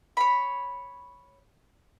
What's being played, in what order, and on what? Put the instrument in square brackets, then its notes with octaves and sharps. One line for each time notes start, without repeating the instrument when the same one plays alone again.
[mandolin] C#5 B5